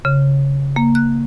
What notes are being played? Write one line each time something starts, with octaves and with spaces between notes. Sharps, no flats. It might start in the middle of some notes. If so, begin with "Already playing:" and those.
C#3
A#3
F#6